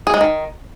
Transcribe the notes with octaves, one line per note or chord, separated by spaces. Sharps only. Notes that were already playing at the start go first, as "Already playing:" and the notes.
G#4
G#3
D#3